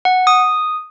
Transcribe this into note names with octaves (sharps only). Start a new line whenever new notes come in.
F#5
D#6